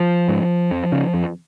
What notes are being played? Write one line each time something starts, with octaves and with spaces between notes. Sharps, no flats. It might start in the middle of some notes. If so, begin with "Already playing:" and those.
Already playing: F3
G#2
F2
C#3
F2